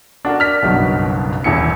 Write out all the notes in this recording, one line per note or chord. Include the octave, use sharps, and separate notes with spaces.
D4 F#4 A4 A#4
D5 F6 B6
F#1 B1 G2 B2 F#3
D#1 E2 E4 C#7